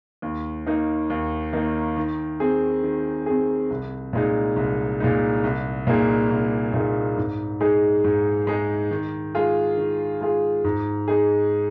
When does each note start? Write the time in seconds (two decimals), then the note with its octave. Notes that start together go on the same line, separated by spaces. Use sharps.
0.22 D#2
0.66 D#3 A#3 D#4
1.10 D#2
1.53 D#3 A#3 D#4
1.96 D#3
2.40 C4 G#4
2.83 D#3
3.26 C4 G#4
3.70 C2
4.13 A#2 G#3 D#4
4.56 C2
5.00 A#2 G#3 D#4
5.44 C2
5.87 A#2 A#3 D#4 G#4
6.30 C2
6.74 A#2 A#3 D#4 G#4
7.17 G#2
7.61 G#3 D#4 G#4
8.04 G#2
8.47 G#3 D#4 G#4
8.91 D#3
9.35 G#3 F4 G#4
9.78 D#3
10.21 G#3 F4 G#4
10.64 G#2
11.08 G#3 D#4 G#4